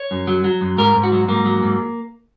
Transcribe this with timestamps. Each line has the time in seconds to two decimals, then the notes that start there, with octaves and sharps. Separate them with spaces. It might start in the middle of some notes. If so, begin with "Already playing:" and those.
Already playing: C#5
0.11 F#2
0.27 F#3
0.44 F#3
0.61 F#2
0.78 G#2 A#4
0.95 G#2
1.03 F#4
1.12 F#3
1.28 G#2 A#3
1.45 F#3
1.63 G#2